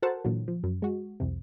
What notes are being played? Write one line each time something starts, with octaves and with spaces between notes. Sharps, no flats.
F#4 A4 A#4 C5 F#5 A5
A#2 D3 E3 F#3
F3
F#2
G#3 F#4
C2 F2 C3